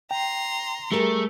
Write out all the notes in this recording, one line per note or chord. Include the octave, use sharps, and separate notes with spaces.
G5 A#5 C6
G3 A3 G4 G#4 A#4